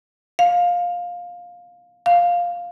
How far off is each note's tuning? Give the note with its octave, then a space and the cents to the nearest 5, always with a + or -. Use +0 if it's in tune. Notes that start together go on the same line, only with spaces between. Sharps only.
F5 +15
F5 +5